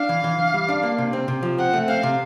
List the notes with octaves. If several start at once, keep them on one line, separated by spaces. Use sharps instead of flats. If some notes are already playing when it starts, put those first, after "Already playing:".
Already playing: D4 F5
E3
E3
E3
G3
D4
A#3
C3
C4
C3
F3
C4 F#5
A3
C4 F5
C3